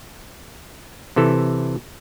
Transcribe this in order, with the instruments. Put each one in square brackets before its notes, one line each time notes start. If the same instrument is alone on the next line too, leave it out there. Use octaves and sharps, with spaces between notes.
[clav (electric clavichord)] C3 E3 A4